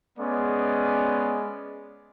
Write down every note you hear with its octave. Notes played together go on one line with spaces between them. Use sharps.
G#3 B3 C#4 D5